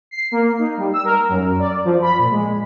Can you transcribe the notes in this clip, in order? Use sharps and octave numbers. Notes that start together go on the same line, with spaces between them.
C7
A#3
D#4
G3
E6
A#4
F#2
D5
F3
B5
A#2
G#3